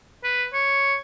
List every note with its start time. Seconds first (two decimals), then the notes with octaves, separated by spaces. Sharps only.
0.24 B4
0.53 C#5